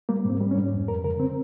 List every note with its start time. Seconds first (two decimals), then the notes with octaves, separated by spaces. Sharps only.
0.09 G3 A#3
0.25 G#2
0.30 C4
0.41 G3
0.51 C#4
0.56 G#2
0.72 F2
0.88 F2 A#4
1.04 C#3 A#4
1.20 C4